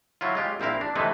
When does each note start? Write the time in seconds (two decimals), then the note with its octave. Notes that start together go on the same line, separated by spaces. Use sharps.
0.21 F#3 E4 F4
0.35 G#3 F4 G4
0.60 A#1 C4 E4 A#4 F5
0.81 D4
0.95 C3 E3 G#3 A3 D#4 B4